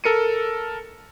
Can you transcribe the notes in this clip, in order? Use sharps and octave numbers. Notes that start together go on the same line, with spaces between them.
A4 A#4 C#7 D#7